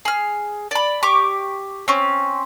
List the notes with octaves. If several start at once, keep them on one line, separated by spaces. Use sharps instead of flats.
G#4 F6
D5 B5
G4 C#6 D6
C4 C#4